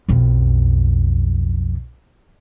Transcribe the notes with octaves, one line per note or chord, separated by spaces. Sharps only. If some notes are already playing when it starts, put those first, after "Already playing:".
B1 F2